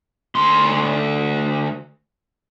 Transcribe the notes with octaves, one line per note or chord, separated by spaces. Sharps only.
D2 C6